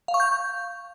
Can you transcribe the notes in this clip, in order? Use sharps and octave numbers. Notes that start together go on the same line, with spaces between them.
F5
C#6
G6